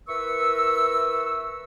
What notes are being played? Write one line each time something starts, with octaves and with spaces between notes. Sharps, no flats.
E4 A#4 B4 C#6 E6